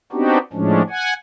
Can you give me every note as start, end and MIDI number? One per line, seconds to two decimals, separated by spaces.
0.12 0.38 59
0.12 0.38 60
0.12 0.38 62
0.12 0.38 63
0.12 0.38 66
0.12 0.38 67
0.53 0.82 45
0.53 0.82 53
0.53 0.82 56
0.53 0.82 61
0.53 0.82 62
0.90 1.14 78
0.90 1.14 80